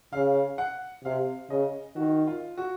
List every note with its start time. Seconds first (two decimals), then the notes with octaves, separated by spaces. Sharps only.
0.13 C#3 F5
0.58 F#5
1.04 C3 F5
1.50 C#3 D#5
1.96 D#3 F#4
2.27 F4
2.58 F#4